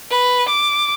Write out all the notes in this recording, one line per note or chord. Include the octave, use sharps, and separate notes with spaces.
B4
D6